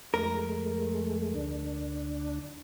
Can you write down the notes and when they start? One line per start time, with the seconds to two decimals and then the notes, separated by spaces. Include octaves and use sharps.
0.14 F2 G#3 A3 A#4
1.34 D2 D4